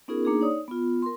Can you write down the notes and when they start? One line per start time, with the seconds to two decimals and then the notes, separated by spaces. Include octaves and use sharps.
0.08 B3 C#4 D#4 F4 G#4 A#4
0.25 A#3 D4 D#4 G#4
0.41 D#4 C#5 D5 D#6
0.68 B3 F4
1.02 A#4 C6